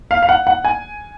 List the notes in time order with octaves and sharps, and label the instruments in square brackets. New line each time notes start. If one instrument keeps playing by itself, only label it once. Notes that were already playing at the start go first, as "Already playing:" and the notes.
[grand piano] F5
F5
F#5
F#5
G#5